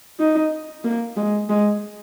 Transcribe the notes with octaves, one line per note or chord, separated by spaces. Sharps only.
D#4
A#3
G#3
G#3